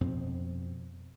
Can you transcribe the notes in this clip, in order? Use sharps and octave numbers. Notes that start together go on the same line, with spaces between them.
F2 B2 C4